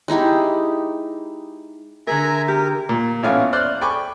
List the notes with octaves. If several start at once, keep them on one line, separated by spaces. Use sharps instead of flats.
G#3 D#4 E4 G4
D3 G#4 A#4 E5 G#5 A#5
G4 A#4
A#2
A1 E3 B3 C#4 F5 G#5
C5 D5 F6 F#6
G5 G#5 B5 C#6 D6